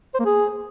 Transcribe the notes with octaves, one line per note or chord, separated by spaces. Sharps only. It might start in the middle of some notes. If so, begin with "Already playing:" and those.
C5
A#3
G#4